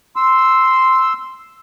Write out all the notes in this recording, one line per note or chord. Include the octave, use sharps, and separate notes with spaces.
C6 E6